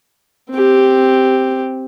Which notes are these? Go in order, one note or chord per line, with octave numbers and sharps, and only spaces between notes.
C4 G4